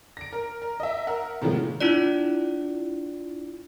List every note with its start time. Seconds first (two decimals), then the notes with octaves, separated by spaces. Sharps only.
0.17 A#6 D7
0.33 A#4
0.62 A#4
0.80 D#5 E5
1.07 A#4 F#5
1.42 A2 C3 D#3 F3 G#3 A#3
1.81 D4 E4 F4 D5